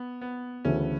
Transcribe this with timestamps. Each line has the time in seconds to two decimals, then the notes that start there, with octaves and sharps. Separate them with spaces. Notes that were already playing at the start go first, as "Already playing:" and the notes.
Already playing: B3
0.21 B3
0.65 D2 C#3 E3 A3 C#4